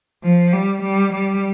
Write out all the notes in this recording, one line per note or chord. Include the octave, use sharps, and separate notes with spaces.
F3
G3
G3
G3